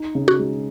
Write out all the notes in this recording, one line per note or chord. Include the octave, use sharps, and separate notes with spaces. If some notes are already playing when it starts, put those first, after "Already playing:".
Already playing: D#4
C#3
F#4
G#3